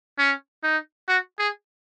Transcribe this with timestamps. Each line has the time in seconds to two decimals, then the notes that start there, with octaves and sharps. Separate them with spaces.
0.18 C#4
0.63 D#4
1.08 F#4
1.39 G#4